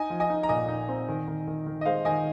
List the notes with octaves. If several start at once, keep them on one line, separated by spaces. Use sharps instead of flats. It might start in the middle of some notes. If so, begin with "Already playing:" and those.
Already playing: D#4 D#5 G#5
F3
D#5 G#5
D#4
A#5
A#2 D#5 G#5
D#4
C4
D#3
D#3
D#3
D#3
D#5
G#3 C5 F5
D#3 D#5 G#5